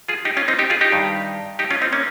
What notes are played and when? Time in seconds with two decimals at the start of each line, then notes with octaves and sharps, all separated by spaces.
0.08 F4 G#4
0.25 D#4 G4
0.37 C#4 F4
0.48 C4 D#4
0.59 D#4 G4
0.70 F4 G#4
0.81 D#4 G4
0.92 G2 D#3
1.59 D#4 G4
1.71 C#4 F4
1.82 C4 D#4
1.93 A#3 C#4